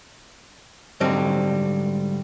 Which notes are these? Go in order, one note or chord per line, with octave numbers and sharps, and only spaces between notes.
G#2 D3 F#3 G3 C4